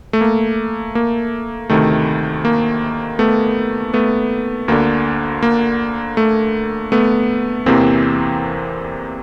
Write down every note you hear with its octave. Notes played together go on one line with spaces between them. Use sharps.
A3
A#3
A#3
D2 C3 D#3 A3
A#3
A3 B3
A3 B3
D2 D3 A#3
A#3
A3
A3 B3
E2 C3 E3 A#3 C4